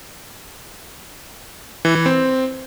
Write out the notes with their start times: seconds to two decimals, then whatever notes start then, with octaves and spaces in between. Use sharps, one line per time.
1.85 E3
1.95 E3
2.06 C4